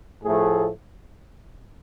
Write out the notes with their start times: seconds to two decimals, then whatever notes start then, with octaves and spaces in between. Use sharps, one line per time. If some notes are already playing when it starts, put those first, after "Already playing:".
0.23 A2 F3 A3 G#4